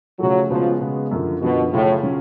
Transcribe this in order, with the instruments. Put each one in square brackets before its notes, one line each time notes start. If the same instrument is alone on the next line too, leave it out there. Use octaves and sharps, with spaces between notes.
[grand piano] C#3 F3 A3 F4 [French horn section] F#3
[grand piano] C#3 G#3 B3 F#4 [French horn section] F3
[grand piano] C#3 G#3 B3 F#4
F#2 D3 F3
[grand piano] F#2 D3 F3 [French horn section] B2
[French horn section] A2 [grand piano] C#3 F#3 C#4 F4
[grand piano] C#3 F#3 C#4 F4